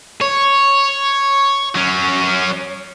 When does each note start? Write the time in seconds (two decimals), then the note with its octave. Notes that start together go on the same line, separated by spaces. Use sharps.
0.21 C#5
1.75 F#3 C#4